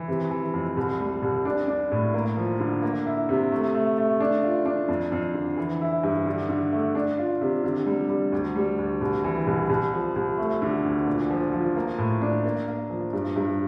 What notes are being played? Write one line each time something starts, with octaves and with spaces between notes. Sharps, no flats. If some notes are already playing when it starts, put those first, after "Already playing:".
Already playing: E3
C3
E3
F2
C2
G3
C2
D4
D4
A2
A#3
F3
D3
A#3
E4
C3
A3
A3
A3
D4
F4
D4
F2
F2
D3
E3
E4
G2
D3
D3
A3
D4
F4
C3
D3
G3
G3
D2
G3
D2
C2
E3
C2
C2
F3
C2
A3
D3
D2
A#2
F3
F3
A#3
A2
D4
A#3
A#3
F3
G2
G2